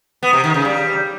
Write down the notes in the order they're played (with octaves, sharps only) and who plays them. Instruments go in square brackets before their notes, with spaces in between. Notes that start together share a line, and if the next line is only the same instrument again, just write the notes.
[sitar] B3
C3
D#3
C#3
G3